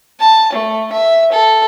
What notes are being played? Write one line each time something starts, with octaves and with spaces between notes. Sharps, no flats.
A5
A3
E5
A4